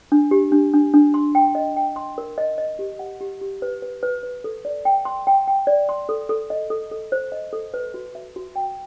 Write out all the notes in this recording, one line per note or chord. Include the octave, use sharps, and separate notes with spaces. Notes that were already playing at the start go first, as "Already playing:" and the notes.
D4
G4
D4
D4
D4
C6
G5
D#5
G5
C6
A#4
D#5
D#5
G4
F#5
G4
G4
B4
B4
B4
B4
A4
D5
G5
C6
G5
G5
D5
C6
A4
A4
D#5
A4
A4
C5
D#5
A4
B4
F#4
E5
F#4
G5